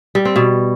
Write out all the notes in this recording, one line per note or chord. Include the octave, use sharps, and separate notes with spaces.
G3
C4
B2